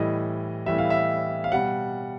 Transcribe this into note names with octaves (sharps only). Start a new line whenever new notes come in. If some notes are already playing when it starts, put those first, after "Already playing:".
Already playing: A2 E3 G3 D#5
A2 E3 G3 E5
F5
E5
F5
B2 G3 F#5